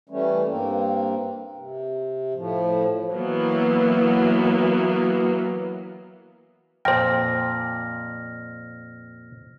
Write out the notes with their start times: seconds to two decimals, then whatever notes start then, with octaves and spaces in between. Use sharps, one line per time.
0.09 E3 G3 A3 C#4
0.46 G2 A#3 C4
1.56 C3
2.34 A2 F3
3.11 E3 F#3 A#3 B3
6.85 F2 A#2 C5 G5 F6 A#6